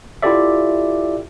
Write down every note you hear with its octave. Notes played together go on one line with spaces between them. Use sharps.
E4 F4 G4 A4 D5 E5